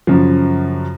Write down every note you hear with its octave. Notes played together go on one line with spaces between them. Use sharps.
F#2 C#3 F3